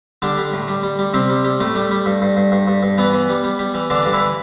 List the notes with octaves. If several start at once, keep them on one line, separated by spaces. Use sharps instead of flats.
D3 G3 D4
G3
A2
G3
G3
G3
C3 G3 C4
G3
G3
A2 A3
G3
G3
G2
G2
G2
G2
G2
G2
E3 B3
E3
G3
G3
G3
E3
D3 E3 D4
G2 D4
E3 E4